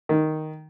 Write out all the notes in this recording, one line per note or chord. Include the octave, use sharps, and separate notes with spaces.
D#3